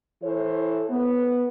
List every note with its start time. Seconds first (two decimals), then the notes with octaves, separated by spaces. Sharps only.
0.22 E3 A4 C5 C#5
0.88 B3